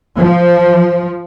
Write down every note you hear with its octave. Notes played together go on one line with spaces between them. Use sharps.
F3